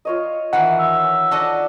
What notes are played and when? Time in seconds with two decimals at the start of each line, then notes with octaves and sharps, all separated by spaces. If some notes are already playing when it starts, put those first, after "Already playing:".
0.05 F4 C#5 D#5
0.53 D#3 E3 F#5
0.79 E5
1.31 D4 F#4 A4 D#5